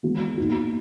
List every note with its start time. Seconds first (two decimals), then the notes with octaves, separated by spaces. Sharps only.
0.03 E3 G#3 B3 F#4
0.38 A#2 A#3 D#4 F#4